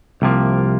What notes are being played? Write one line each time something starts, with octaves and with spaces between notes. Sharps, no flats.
C2 C3 F3 A#3